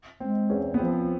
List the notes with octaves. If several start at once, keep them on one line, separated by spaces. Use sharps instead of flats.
G#3 C4
E2 C#4
B3
F3 C4